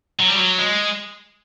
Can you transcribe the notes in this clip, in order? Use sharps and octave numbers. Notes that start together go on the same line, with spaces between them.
F#3
G3
F#3
G#3